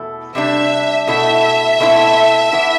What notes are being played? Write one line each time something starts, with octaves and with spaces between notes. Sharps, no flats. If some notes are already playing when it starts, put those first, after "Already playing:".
Already playing: E2 B2 A3 E4
C3 G3 D4 E5
B2 A3 E4 E5
B2 A3 C4 E4
E3 B3 E4